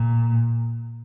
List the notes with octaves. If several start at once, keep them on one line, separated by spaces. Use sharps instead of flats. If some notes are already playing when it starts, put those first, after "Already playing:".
Already playing: A#2